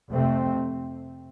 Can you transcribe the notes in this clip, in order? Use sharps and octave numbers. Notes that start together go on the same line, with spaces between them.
F2 C3 A3 C4